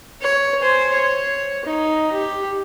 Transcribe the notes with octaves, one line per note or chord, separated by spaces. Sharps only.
C#5
C5 G#5
C#5
D#4
G4